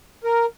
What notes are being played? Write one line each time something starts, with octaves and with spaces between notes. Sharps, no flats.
A#4